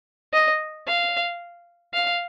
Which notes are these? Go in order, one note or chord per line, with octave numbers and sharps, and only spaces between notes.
D#5
F5
F5